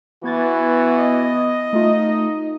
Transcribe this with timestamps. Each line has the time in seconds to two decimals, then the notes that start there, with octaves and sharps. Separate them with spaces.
0.24 E3 B3 F#4 G#6 A6
0.99 D#5
1.73 A3 D#4 F4